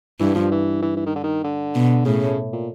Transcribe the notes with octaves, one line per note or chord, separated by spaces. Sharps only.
G2 E3
F3
E3
E3
E3
D#3
D3
D#3
D3
B2
A2 C#3
A#2